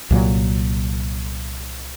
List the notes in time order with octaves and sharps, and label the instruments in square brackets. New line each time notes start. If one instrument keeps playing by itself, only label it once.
[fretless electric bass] C2 A#2 F#3